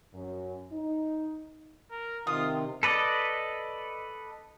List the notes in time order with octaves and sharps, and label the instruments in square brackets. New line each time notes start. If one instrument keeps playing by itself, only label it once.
[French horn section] F#2
D#4
[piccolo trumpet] A#4
[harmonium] C3 [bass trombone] D#3 [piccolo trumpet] F4 [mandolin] D#6
[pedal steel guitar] A4 B4 D5 D#5